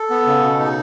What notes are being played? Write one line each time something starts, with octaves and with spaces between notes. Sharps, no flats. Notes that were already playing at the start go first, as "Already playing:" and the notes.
Already playing: A4
B3
C#3
B2
D#4